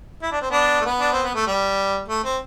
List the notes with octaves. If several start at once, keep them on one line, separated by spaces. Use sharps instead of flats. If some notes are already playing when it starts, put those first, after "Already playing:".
E4
D4
C4
B3 D4
A3
B3
D4
C4
B3
A3
G3
A3
C4